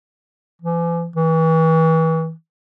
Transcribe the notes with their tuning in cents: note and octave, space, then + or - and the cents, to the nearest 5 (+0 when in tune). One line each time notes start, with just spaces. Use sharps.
E3 +45
E3 -30